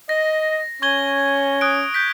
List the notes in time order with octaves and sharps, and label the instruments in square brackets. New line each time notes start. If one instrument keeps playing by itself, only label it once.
[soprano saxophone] D#5 [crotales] A#6
[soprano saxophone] C#4 [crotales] C#6 G#6 G7
[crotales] D#6 F#6 D7
G6 B6